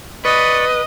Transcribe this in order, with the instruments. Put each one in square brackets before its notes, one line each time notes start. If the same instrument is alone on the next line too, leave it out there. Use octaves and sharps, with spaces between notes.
[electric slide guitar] B4 [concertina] D5 C#6 [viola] D#5